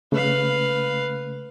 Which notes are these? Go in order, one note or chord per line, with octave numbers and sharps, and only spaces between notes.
C#3 A3 B4 F5